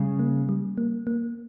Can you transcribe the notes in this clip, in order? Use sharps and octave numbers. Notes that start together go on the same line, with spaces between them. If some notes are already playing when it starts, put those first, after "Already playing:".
Already playing: C#3 G3
A#3
G3
A#3
A#3